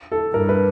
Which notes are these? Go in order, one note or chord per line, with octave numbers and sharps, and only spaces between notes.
A4
G2 A#4
B4